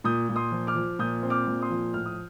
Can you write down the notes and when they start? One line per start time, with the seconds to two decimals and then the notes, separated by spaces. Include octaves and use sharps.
0.04 A#2 D#6 G6
0.29 A#2
0.36 C6 D#6
0.52 F3
0.67 D6 F6
0.76 F3
0.99 A#2 D#6 G6
1.23 C4
1.30 D6 F6
1.47 A#2
1.62 C6 D#6
1.70 F3
1.94 A2 F6
2.06 D#6